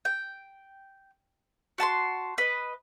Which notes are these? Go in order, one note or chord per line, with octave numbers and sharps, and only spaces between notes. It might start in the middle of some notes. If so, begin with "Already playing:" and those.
G5
F#4 A5 B5 C6
B4 D#5